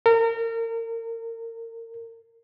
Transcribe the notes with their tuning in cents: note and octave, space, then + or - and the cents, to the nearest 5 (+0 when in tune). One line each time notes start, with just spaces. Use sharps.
A#4 -30